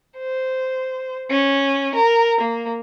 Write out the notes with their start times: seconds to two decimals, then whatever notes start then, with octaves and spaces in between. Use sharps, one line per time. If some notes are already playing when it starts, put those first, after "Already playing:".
0.17 C5
1.30 C#4
1.95 A#4
2.40 A#3